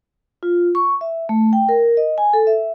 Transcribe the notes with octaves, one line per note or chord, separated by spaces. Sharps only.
F4
C#6
E5
A3
G5
A#4
D#5
G#5
A4
E5